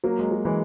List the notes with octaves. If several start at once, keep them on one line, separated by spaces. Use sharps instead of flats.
F#3 A#3
G#3
F#3
E3 G#3